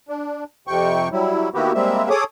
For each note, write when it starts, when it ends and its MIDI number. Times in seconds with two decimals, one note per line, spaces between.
0.09 0.44 62
0.67 1.09 41
0.67 1.09 48
0.67 1.09 79
0.67 1.09 85
1.12 1.49 54
1.12 1.49 55
1.12 1.49 64
1.54 1.72 51
1.54 1.72 58
1.54 1.72 59
1.54 1.72 64
1.54 1.72 66
1.54 1.72 67
1.74 2.09 55
1.74 2.09 56
1.74 2.09 58
1.74 2.09 60
1.74 2.09 76
2.10 2.24 68
2.10 2.24 69
2.10 2.24 73
2.10 2.24 86
2.10 2.24 87